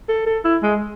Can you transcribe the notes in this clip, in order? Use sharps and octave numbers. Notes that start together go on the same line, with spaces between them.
A4
A4
E4
G#3